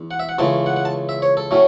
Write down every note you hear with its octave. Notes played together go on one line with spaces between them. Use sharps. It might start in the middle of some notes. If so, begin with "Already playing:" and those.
Already playing: E2
F#5
E5
F#5
C#2 C#3 E3 A3 A5
F#5
F#5
A5
E5
C#5
A4
A2 F#3 A3 C#4